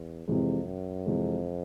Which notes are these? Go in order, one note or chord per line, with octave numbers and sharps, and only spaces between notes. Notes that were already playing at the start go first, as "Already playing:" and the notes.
Already playing: E2
F2 C3 E3 G#3
F#2
F2 C3 E3 G#3